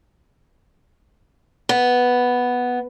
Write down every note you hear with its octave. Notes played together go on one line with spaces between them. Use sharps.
B3